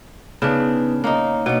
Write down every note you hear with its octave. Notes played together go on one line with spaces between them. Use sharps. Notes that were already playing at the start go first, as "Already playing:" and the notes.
C#3 B3 D4 D#4 B4
A#3 D#4 C#5 A#5
B2 A#3 D4 C#5